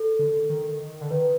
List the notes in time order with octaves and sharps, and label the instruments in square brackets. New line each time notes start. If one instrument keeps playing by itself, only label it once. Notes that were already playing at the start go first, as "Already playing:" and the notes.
Already playing: [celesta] A4
[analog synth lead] D3
D#3
D3
[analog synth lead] D#3 [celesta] B4